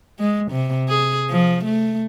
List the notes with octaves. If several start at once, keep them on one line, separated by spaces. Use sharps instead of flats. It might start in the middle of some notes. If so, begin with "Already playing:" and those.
G#3
C3
G#4
F3
A3